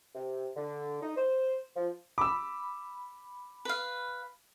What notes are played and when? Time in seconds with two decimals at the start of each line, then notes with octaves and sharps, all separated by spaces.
0.15 C3
0.56 D3
1.01 D#4
1.16 C5
1.76 F3
2.18 B5 D6 E6
3.65 B4 F5